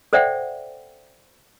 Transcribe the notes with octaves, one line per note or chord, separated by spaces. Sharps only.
A4 C5 D5 E5 F#5 G5